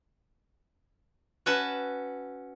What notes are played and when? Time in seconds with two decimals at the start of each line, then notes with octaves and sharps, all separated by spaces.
1.46 C#4 F#4 B4 E5 A5